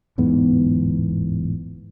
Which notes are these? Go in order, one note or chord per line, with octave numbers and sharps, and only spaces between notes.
D1 E2 G#2 B3